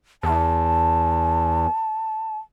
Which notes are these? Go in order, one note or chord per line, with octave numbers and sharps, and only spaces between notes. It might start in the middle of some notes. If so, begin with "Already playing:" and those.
E2 A5